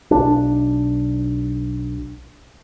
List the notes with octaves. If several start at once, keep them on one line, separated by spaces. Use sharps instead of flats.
B1 D4